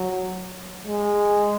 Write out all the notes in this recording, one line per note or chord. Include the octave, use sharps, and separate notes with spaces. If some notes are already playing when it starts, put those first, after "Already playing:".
Already playing: F#3
G#3